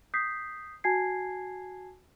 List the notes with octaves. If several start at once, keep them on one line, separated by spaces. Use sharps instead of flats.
D#6 G6 B6 C7
F#4 G#5 A5 G#6 C7